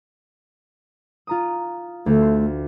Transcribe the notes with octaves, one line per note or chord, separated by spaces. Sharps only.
F4 A#5 D#6
D2 A3
C6